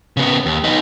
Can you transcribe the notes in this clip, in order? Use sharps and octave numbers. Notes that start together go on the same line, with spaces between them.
C#3 B3
D#2
B3 D#4